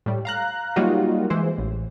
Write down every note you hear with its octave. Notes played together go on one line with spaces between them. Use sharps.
A2 G3
F5 A#5 F#6
F#3 G3 A#3 D#4 F4 F#4
E3 G#3 C5
A1